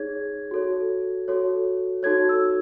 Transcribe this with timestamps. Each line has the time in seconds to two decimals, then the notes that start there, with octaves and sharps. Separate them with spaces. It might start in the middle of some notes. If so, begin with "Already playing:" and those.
Already playing: D#4 G#4 C#5 G#6
0.51 F#4 A4 C#5
1.28 F#4 A4 C#5
2.03 D#4 F#4 A4 C#5 G#6
2.29 E6